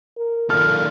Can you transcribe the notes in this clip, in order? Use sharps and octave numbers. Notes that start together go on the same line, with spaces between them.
A#4
A#2 D#3 A4 F6